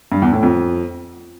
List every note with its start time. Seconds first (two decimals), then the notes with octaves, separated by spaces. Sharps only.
0.12 G2
0.22 E2
0.32 A2
0.43 F2